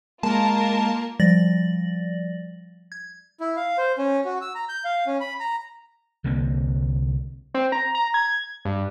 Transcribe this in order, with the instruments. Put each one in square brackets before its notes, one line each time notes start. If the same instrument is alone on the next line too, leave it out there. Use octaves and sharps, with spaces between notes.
[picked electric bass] G#3 [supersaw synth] A#3 [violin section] F4 A#4 [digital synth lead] A5
[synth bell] F3 G3 D5 A6 A#6 F#7
G#6
[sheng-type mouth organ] E4
F5
C5
C#4
F#4
E6
A#5
G6
F5
C#4
B5
A#5
[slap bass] C2 D3 A#3 C4
[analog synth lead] C4
A#5
A#5
G#6
G2